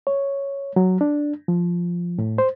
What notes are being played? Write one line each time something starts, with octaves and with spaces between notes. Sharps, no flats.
C#5
F#3
D4
F3
A2
C5